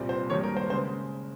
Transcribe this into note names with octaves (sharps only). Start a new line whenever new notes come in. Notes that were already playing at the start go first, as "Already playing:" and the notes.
Already playing: C2 A#2 G3 C4
C5
G#1 G2 D#3 A#3 C#5
A#4
C5
C#3 G#3 C5